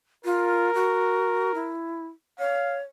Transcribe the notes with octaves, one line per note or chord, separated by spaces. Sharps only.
F4 A#4
F#4
E4
C#5 F5